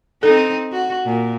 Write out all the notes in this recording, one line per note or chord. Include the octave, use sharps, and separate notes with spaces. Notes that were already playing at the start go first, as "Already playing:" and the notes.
C4 D#4 A4
F#4
A#2